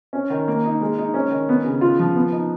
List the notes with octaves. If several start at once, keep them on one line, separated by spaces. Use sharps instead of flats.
C#4
D#3
A#3
D#4
G#3
D#4
C#4
D#3
B3
C#3
F4
F3
B3
D#4